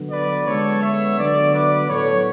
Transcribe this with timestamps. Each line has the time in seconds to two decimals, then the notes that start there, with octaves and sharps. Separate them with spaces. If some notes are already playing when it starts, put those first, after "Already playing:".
Already playing: D3 F#3 B3
0.11 B4 D5
0.46 D3 G#3 B3 A4 C#5
0.81 C#5 E5
1.17 D3 F#3 B3 B4 D5
1.52 B4 D5
1.88 A2 F#3 B3 A4 C#5